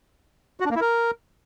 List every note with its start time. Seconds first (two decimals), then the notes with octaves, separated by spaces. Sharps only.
0.60 F#4
0.65 D4
0.71 A#3
0.76 E4
0.81 A#4